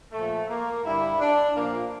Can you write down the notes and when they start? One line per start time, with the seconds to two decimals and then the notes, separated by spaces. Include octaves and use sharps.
0.11 A#2 F3 A3
0.47 A#3
0.84 G2 D3 G3 E4
1.19 D4
1.55 A#2 F3 A#3